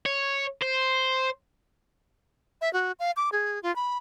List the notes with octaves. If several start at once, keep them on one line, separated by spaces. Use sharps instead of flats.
C#5
C5
E5
F#4
F5
D6
G#4
F4
B5